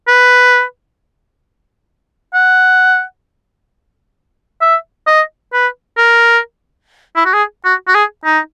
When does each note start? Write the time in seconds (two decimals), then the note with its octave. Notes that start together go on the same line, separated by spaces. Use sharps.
0.08 B4
2.34 F#5
4.62 E5
5.07 D#5
5.53 B4
5.98 A#4
7.16 E4
7.25 F#4
7.34 G#4
7.65 F#4
7.88 F#4
7.95 G#4
8.25 D#4